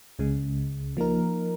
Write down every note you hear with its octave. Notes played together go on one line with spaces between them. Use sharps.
C#2 C#3 G#3
F3 A#3 D#4 A#4